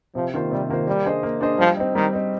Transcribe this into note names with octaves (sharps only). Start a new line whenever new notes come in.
C3 F3
D#3 A#3 F4 C5
C3 G3
D#3 A#3 F4 C5
G3 A#3
D4 G#4 C5 D#5
A#3
D4 G#4 C5 D#5
F3 G3
C4 D#4
D#3 G3
C4 D#4